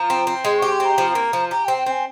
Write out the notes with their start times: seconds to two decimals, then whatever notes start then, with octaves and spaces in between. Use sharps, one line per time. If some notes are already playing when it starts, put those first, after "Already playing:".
Already playing: F3 A#5
0.10 C4
0.27 C4
0.45 G#3 C6
0.58 G4 C#6
0.72 C6
0.80 C4
0.85 A#5
0.98 F3
1.15 A#3
1.33 F3
1.51 G4 A#5
1.65 G5
1.68 C4
1.77 G5
1.86 C4 G#5